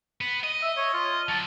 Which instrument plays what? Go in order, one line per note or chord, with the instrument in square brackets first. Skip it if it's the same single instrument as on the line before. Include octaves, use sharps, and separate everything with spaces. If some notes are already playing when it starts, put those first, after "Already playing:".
[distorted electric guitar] B3
D#5
[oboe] E5
C#5
F4
[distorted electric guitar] D3 F#3 [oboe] A5